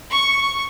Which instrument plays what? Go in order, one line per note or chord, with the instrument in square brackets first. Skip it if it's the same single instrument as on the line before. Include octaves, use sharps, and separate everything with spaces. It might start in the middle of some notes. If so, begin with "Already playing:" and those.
[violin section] C#6